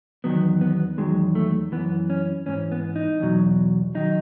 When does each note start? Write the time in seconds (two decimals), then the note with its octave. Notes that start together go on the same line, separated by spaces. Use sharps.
0.24 E2 D#3 F#3 B3
0.61 B3
0.98 E2 D#3 F#3 G#3
1.35 A3
1.72 F#2 E3 B3
2.10 C#4
2.46 G#2 E3 C#4
2.72 B3
2.96 D#4
3.20 E2 B2 F#3
3.95 D#3 F#3 D#4